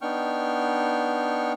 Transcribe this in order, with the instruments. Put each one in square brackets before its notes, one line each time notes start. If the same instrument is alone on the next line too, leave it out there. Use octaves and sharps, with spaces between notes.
[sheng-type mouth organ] B3 D4 D#4 G5 C#6 F6